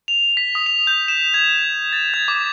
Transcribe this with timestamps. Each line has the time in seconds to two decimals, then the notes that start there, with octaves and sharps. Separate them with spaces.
0.08 F7
0.37 B6
0.55 D#6
0.66 F7
0.87 G6
1.08 E7
1.34 G#6
1.93 A6
2.14 G#6
2.28 D6